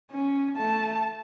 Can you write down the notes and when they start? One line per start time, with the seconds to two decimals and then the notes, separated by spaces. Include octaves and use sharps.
0.11 C#4
0.58 A3 A5